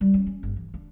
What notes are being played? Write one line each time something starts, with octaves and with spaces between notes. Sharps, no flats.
G3
C#4
C#4
G1
E3
D4